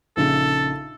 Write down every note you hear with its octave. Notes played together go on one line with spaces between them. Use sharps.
A#1 C#3 D#4 A4